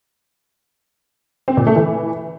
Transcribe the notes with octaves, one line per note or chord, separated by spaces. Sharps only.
C4
A#2
A3
E3